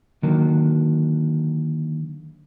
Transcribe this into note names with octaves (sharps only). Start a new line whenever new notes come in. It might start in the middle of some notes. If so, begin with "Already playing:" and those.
D3 D#3 F#3 A#3